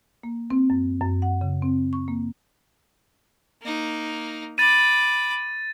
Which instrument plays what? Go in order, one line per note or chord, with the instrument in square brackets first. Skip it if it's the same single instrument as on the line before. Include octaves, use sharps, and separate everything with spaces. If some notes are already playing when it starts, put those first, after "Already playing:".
[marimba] A#3
C4
F#2
F#2
F#5
C#3
C4
C#6
A#3
[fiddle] A#3 D#4
[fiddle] B5 D6 [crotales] A6 D#7